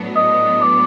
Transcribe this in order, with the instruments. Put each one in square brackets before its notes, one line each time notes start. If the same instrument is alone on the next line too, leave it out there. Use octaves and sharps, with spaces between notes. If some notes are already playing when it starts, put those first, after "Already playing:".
Already playing: [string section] A2 F#3 B3 D4
[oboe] D#5
D5